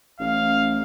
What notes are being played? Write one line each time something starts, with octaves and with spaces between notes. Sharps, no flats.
A1 F5